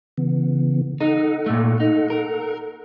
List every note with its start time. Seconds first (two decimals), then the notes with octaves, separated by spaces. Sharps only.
0.18 C#3 E3 B3
1.01 D#4 A4 F#5
1.46 A#2 A3
1.80 D#4
2.10 A#4